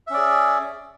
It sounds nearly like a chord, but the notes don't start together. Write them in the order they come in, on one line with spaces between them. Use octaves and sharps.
E5 C#4 D5 G#4